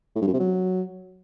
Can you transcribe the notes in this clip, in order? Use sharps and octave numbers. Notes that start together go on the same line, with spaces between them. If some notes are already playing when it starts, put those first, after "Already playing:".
A2
G2
F#2
C3
F#3